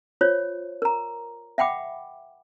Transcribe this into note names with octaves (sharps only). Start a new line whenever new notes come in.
F4 C5 C#5
A#4 A#5
E5 F#5 G5 B5 D6